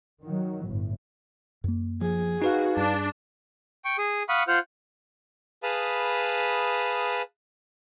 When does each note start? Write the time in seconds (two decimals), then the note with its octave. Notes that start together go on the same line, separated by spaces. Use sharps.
0.22 D#3 F#3
0.64 G1 A2
1.64 F#2 A#3
2.01 F3 G#4
2.42 D#4 F#4 B4 F5
2.77 G2 D4
3.85 G5 C#6
3.98 G#4 D#6
4.29 F5 F#5 B5 C#6 D#6
4.48 F4 C5 F#5 F6
5.63 G#4 B4 F5 A5 B5 D#6